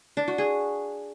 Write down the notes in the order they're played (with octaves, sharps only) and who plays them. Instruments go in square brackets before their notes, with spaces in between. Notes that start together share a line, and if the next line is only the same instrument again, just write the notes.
[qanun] D4
F#4
G#4